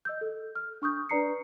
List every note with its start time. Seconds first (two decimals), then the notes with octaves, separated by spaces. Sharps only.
0.05 D#5 E6 G6
0.21 A4
0.55 F6
0.82 D4 C#6 D#6 G6
1.09 D4 B4 D5 A#5 C7 C#7